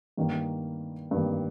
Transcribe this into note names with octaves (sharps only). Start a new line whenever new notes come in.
G2 D#3 A#3
G2 D#3 A#3